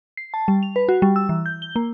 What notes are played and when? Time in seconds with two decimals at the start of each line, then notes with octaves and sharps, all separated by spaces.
0.17 C7
0.34 A5
0.48 G3
0.63 F7
0.76 B4
0.89 F#4
1.02 G3
1.16 E6
1.29 E3
1.46 G6
1.62 G7
1.76 A#3